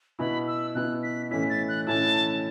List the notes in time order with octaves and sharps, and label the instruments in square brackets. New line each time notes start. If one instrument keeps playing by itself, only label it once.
[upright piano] B2 B3 E4 [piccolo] B5
[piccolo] E6
[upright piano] B2 B3 E4 [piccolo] F#6
[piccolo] B6
[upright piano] A2 E3 C#4 E4 [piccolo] B6
[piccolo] A6
F#6
[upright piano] A2 E3 C#4 E4 [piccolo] A5